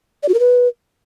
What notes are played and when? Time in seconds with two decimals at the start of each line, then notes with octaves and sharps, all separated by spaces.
0.23 D5
0.29 F#4
0.34 A#4
0.39 B4